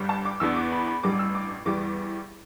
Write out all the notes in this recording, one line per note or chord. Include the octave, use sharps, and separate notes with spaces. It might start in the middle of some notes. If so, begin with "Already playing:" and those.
Already playing: G1 G2 G3
A5
D6
E2 E3 B3 D4 E6
D6
B5
B5
A1 G2 G3 D6
E6
D6
E2 E3 G3 D6
D6